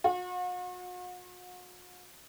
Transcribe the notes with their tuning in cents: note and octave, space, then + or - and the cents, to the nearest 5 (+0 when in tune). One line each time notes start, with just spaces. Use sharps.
F#4 -40